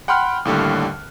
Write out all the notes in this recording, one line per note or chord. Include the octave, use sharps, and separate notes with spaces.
F#5 G5 B5 C6 F6 F#6
D#2 A2 D3 G3